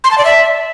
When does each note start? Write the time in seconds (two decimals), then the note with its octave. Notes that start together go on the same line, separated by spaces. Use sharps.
0.04 C6
0.11 A5
0.18 D5
0.25 E5